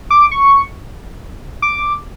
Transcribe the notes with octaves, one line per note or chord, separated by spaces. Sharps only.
D6
C#6
D6